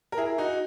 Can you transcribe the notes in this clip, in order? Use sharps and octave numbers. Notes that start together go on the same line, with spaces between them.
A#4
E4 G#4
D#4 F#4